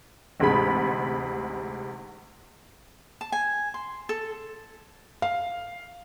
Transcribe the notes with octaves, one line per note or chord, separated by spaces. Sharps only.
A1 D2 G#2 C3 G#4 B5
A5
G#5
C6
A4
F5